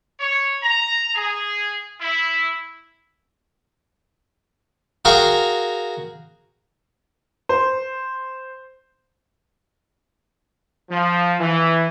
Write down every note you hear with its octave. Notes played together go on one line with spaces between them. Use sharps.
C#5
A#5
G#4
E4
F#4 G#4 A#4 F5 G5 A#5
C5
F3
E3